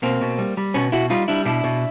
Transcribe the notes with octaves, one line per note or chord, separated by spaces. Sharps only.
B2 A#3 C4
B2
G3
G3
B2 B3 C#4
B2 E4 F#4
G3 D#4 F4
G3 D4 E4
B2 D4 E4
B2